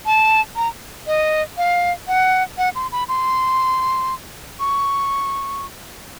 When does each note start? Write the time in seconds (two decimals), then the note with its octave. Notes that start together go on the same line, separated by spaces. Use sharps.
0.06 A5
0.56 A#5
1.07 D#5
1.57 F5
2.08 F#5
2.58 F#5
2.75 C6
2.92 B5
3.08 C6
4.60 C#6